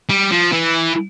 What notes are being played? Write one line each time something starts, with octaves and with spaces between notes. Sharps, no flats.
G3
F3
E3